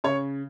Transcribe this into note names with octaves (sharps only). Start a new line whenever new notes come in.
C#3 C#5 C#6